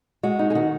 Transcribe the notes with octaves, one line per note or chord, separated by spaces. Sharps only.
G#3 F#4
D#4
G#4
D#3 F#4